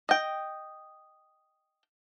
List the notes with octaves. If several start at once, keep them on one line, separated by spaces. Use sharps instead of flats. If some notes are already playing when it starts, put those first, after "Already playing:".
D#5 G5